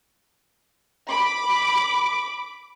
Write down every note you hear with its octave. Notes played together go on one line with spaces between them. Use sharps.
B5 D6